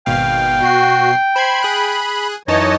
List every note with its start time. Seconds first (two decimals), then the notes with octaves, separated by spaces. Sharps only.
0.06 G#1 B2 F5 G5
0.62 B2 F#4 C7
1.36 C5 B5 G#6 C7
1.63 G#4 F#6
2.48 F#2 E3 D#4 C#5 D#5 A5